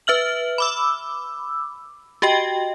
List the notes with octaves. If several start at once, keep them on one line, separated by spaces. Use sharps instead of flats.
B4 E5 F6 F#7
B5 D6 E6
F#4 G4 D#5 G5